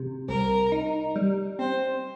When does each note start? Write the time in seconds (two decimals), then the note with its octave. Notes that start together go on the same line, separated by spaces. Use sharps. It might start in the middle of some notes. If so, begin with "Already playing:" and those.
Already playing: C3
0.28 C2 A#4
0.72 D#4
1.16 G3
1.59 C4 C5